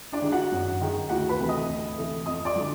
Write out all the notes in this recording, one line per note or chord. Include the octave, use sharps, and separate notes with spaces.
D4 D5
D#3 G#3
F#4 F#5
F#2
D#3 G#3
D2 F#4 F#5
B4 B5
C3 E3 A3
D#5 D#6
D2
C3 E3 A3
F2 D#5 D#6
D5 D6
D3 F#3